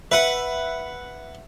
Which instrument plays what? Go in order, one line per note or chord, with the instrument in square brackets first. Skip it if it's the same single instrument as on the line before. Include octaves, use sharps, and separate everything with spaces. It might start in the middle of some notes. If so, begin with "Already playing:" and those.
[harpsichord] B4 F#5 [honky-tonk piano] E5